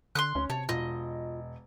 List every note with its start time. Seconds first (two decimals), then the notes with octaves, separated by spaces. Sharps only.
0.15 D3 C6 D#6 F#6
0.35 D2 C#4
0.50 C3 C#5 A5
0.69 E1 F4 D#5